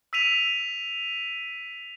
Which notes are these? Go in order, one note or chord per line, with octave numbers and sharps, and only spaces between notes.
E6 B6 D#7 F7